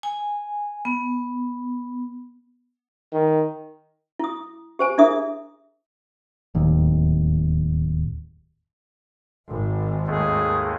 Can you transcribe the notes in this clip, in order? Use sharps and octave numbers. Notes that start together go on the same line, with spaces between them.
G#5
B3
D#3
E4 D#6
G4 C5 G#5
D4 E4 G#4 A#4 E5 D#6
D1 D#2
G#1
D#2 G#3 A3 G#4